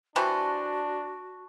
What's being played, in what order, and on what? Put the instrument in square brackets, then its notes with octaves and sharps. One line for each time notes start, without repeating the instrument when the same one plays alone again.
[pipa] E3 G3 C5 [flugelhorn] D4 [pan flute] F#4 [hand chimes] A5 C#6 F#6